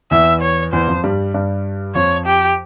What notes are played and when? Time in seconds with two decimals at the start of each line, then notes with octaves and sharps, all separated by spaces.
0.11 E2 E3 E5
0.42 C#5
0.73 E2 E3 C5
0.88 F2 F3
1.04 G2 G3
1.34 G2 G3
1.95 F2 F3 C#5
2.26 G4